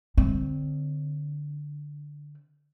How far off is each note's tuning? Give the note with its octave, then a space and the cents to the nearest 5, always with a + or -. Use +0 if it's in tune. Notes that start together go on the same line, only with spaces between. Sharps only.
D3 +0 C4 +0